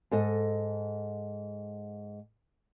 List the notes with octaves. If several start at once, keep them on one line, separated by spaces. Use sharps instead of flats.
G#2 A4 D#5